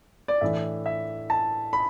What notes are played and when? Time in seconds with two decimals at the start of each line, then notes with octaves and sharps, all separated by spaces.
0.28 D5
0.41 A2 E3 D4 E5
0.86 E5
1.30 A5
1.73 B5